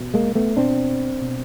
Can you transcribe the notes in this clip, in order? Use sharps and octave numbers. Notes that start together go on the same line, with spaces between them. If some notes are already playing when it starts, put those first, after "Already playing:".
Already playing: B2
G#3 A#3
A3 B3
B2 C4 D4
B2